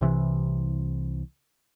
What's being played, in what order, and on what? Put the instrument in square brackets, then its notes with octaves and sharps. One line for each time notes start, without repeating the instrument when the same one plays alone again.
[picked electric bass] C2 C3 E3